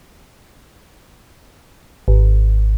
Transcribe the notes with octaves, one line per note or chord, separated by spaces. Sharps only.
G#1